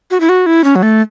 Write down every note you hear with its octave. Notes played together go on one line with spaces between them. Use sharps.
F#4
E4
F#4
E4
C#4
F#3
A3